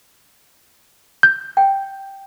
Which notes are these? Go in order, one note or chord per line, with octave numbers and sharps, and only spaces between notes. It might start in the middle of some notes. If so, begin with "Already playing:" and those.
G6
G5